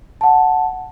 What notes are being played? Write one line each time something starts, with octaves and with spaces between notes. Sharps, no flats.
F#5 A5